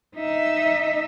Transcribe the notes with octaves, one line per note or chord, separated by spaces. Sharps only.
D#4 E5